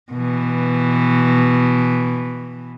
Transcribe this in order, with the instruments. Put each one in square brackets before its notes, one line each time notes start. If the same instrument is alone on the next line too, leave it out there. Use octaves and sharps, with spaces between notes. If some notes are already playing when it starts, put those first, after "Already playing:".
[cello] B2 E3